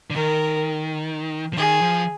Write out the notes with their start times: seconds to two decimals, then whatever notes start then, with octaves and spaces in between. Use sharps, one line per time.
0.10 D3
0.15 D#3 A#4
1.53 F3
1.57 D#3 G#4
1.82 F3